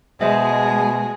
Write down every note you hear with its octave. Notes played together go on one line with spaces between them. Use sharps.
B2 G#3 G#4 C5 D#5 E5